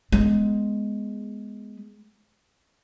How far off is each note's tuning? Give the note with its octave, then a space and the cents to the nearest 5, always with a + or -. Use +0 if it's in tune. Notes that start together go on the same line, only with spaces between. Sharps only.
G#3 +5 B3 +10